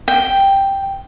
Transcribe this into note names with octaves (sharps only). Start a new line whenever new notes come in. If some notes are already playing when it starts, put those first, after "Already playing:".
G5